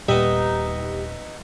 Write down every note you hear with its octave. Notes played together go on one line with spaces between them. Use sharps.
D#1 A#2 G3 B3 D#4 G4 D#5 E5